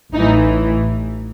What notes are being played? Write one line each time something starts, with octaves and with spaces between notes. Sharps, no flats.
A1 A2 E3 D#4